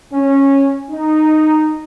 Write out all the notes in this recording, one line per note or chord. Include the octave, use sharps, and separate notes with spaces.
C#4
D#4